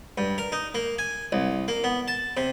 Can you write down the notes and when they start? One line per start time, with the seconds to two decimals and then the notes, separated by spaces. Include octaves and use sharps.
0.18 G2
0.38 A#4
0.52 D#4
0.75 A#3
0.98 G#5
1.32 C2
1.68 A#3
1.84 B3
2.08 A5
2.37 C3